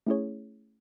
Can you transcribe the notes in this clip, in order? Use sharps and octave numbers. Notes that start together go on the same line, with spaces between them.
A3 C#4 E4 G#4 C#5